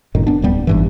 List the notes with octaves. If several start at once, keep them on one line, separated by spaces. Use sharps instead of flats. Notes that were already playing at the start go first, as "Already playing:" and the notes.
G1 F#2 A2 D#3
B3 D4
D1 D#2 G3 B3
G#1 G2 E3